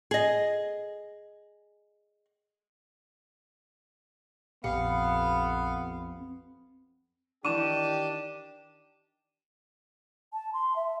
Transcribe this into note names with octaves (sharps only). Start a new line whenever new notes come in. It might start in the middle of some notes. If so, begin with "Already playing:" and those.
G#4 D#5
A#1 F2 B3 G4 F5 C#7
D#3 E3 D4 G4 C#6 D#7 E7
A5
C6
E5